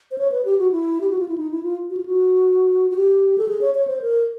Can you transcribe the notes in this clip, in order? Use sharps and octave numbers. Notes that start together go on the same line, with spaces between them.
C5
C#5
B4
G4
F#4
E4
G4
F#4
F4
E4
D#4
E4
F4
F#4
F4
F#4
F#4
G4
A4
G#4
C#5
C#5
C5
A#4